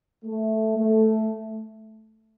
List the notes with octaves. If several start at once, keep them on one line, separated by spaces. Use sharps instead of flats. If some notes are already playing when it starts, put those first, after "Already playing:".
A3
A3